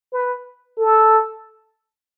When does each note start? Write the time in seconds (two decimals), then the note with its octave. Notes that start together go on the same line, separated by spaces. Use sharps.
0.13 B4
0.78 A4